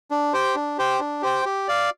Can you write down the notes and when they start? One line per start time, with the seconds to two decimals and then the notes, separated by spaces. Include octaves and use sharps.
0.11 D4
0.33 G4 C5 G5
0.55 D4
0.78 G4 C5 G5
1.00 D4
1.22 G4 C5 G5
1.45 G4
1.68 D5 F5